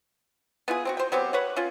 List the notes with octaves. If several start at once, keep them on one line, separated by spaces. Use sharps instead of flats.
B3 E4 F4 G#4
C4 D4 F#4
C5 G5
F#3 B3 C4 G4
B4 C#5 F#5
C#4 F4